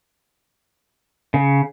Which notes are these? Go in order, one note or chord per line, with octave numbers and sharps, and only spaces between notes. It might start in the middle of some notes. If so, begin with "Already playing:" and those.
C#3